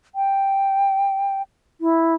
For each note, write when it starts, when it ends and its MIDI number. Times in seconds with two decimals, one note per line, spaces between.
0.15 1.42 79
1.81 2.15 64